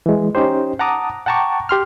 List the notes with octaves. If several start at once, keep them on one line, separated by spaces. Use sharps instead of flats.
E3 G#3
C#4 D#4 G4 C5
F#5 A5 A#5 D6 D#6
F#5 G5 A5 A#5 C#6 D6
G4 C6 F6